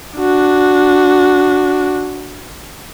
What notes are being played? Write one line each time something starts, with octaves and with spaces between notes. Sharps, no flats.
D4 F#4